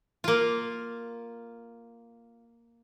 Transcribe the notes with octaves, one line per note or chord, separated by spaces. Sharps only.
A#3 F4